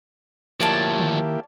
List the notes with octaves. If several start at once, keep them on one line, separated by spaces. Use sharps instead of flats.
D2 F3 A#3 E4 G4 C#5 D5 A5
D#3